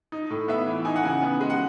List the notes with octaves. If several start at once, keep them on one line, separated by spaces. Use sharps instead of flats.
D#4
A2
B3 E5
E3
D#4 G#5
F#5
C#3 G#5
B3
G#3
F#5